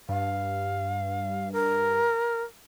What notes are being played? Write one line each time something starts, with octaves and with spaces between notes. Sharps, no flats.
G2 F5
A#4